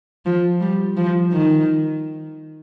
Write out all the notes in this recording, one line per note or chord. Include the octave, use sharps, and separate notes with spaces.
F3
G3
F3
D#3